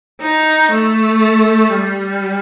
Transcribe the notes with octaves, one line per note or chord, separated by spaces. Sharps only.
D#4
A3
G3